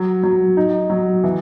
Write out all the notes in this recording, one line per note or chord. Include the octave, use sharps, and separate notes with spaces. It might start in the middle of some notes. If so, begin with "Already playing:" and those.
Already playing: F#3
F#3
D#4
F#3
E3